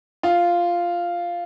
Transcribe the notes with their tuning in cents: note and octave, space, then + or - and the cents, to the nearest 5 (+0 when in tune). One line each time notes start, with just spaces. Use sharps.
F4 -5